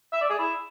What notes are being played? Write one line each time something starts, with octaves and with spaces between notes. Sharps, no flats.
E5
D5
G#4
E4